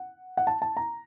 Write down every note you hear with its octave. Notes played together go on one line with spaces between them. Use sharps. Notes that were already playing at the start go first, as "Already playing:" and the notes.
Already playing: F#5
F#5
A5
A5
A#5